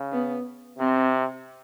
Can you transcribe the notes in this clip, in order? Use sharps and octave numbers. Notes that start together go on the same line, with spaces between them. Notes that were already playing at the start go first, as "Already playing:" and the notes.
Already playing: C#3
B3
C3 C4